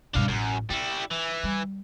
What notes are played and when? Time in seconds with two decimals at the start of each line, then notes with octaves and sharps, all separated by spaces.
0.14 G2 B2 D4 F5
0.28 A1 F#2
0.70 G3 D4 E4
1.11 E3
1.44 G3